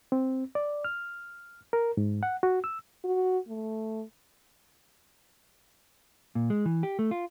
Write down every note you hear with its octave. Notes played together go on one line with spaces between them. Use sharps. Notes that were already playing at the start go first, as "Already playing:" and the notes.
C4
D5
F6
A#4
G#2
F#5
F#4
E6
F#4
A3
A#2
G#3
E3
G4
A3
F4